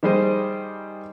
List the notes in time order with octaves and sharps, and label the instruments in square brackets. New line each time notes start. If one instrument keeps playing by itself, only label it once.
[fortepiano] D#3 G3 G#4 C5 D#5